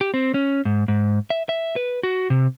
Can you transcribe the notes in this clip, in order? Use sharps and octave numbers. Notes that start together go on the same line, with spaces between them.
G4
C4
C#4
G#2
G#2
E5
E5
B4
F#4
C3